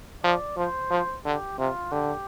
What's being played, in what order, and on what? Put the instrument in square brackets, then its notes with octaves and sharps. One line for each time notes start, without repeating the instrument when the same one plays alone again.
[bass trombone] F3 [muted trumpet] D5
[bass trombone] F3 [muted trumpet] C5
[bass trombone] F3
[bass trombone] D3 [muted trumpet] G4
[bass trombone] C3 [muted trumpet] F4
[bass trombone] D3 [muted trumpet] G4